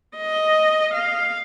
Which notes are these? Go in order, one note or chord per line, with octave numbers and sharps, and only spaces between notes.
D#5
F5